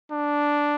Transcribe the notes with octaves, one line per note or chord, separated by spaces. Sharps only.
D4